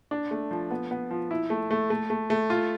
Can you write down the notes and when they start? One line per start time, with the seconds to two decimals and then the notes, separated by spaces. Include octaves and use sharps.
0.11 D4
0.31 A3
0.51 F3
0.70 B3
0.91 B3
1.11 F3
1.31 E4
1.50 A3
1.71 A3
1.90 A3
2.10 A3
2.30 A3
2.50 F4